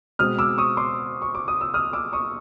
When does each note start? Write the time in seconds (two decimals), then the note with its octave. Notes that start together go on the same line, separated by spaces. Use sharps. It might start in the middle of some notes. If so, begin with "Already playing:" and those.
0.19 B2 G#3 C4 D#6 F6
0.39 D6 E6
0.58 C#6 D#6
0.77 C6 D6
1.22 C#6
1.35 D6
1.48 D#6
1.61 E6
1.74 D#6 F6
1.93 D6 E6
2.13 C#6 D#6